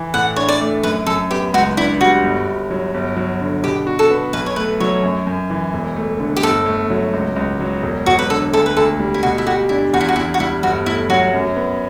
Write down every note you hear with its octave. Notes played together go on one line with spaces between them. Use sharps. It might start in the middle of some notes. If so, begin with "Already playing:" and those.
Already playing: E3
A2 F#5
D4 C#5
D5
A3
F#2 B4
F#2 A4
B3 G4
C#2 F#4
D4 E4
G3 F#4
G1
G1
F#3
G1
F#3
D3
B2 G4
F#4
A4
B3
B1 B4
C#5
A3 B4
F#3 C#5
F#2
F#2
E3
E1
A3
D3
G4
G1 A4
A3
F#3
C#2
C#2
F#3
E1
E1 F#4
B4
D3 A4
D2 A4
B4
D2 A4
G3
E4
B2 F#4
E4
F#4 G4
D4 E4
E2 F#4
E4
F#4
E2 E4
F#4
G3 E4
G1 F#4
A3 E4
F#3 F#4
F#2
B3